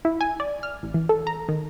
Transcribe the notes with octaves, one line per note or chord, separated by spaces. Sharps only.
E4
G#5
D5
F6
A1
E3
A4
A#5
D#3